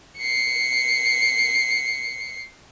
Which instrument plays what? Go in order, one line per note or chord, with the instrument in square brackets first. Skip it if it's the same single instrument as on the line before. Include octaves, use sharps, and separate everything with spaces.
[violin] C7 C#7